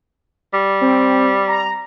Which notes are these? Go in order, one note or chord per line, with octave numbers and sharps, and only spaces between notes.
G3
C4
A#5